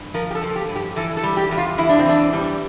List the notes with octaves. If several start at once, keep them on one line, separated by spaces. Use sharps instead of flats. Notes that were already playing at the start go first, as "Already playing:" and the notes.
Already playing: G2
F3 A#4
G4
A4
F3
G4
G2
G4
E3 A4
A4
G3
G4
E2
F4
E2 E4
D4
C4
E3 D4
G3